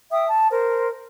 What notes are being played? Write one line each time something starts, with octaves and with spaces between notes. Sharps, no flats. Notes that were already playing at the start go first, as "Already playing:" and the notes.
E5 G5 D#6
A5
A#4 C5